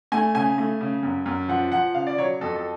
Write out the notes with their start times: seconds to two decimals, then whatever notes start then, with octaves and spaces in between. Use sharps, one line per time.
0.12 A3 G#5
0.34 C#3 G#5
0.58 A3
0.81 C#3
1.03 F#2
1.26 F#2
1.48 F3 F#5
1.72 F3 F#5
1.94 C#3 F5
2.07 D5
2.18 F#3 C#5
2.41 F2 A4
2.56 A4